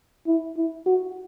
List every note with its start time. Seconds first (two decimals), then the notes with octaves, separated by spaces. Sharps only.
0.27 E4
0.56 E4
0.86 F#4